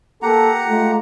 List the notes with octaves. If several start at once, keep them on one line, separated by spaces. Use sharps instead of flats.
A#3 G4 A4 F#5 A#5
G#3 A3 F4